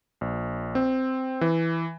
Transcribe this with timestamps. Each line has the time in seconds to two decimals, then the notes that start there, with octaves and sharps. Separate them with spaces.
0.21 A#1
0.75 C4
1.41 E3